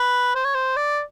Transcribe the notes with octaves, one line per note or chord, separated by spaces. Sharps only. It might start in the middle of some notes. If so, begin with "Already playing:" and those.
Already playing: B4
C5
C#5
C5
D5